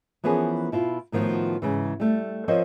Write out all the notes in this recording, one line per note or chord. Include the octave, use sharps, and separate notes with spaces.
E3 F3 B3 C#4 G#4 A#4
B2 E4 F4
A2 D#3 F3 B3 F4 F#4
G#2 C#3 E3
G3 A3
F3 C4 A#4 C5 C#5 D#5